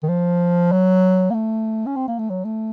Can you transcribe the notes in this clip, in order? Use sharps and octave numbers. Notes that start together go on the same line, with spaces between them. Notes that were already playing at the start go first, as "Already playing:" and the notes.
D#3
F3
F#3
A#3
A3
C#4
C4
A#3
A3
F#3
A3